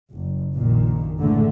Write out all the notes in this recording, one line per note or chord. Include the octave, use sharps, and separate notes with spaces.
F#1
A#1 F#2 A#2 D#3
A2 D3 E3 G#3 A3